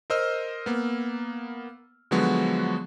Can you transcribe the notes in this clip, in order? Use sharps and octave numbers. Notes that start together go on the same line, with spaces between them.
A#4 C5 D#5 E6 F6
A#3 B3
D3 F3 F#3 G#3 B3 F#4